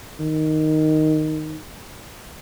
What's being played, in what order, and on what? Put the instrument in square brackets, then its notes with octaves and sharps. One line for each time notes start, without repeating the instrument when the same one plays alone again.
[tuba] D#3